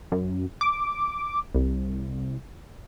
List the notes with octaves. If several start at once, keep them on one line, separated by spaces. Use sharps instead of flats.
F#2
D6
C2